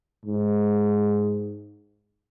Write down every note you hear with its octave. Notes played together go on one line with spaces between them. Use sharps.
G#2